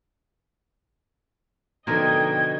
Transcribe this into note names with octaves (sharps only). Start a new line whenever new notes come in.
B2 D3 F3 D#4 A#4 D#5 G5 G#6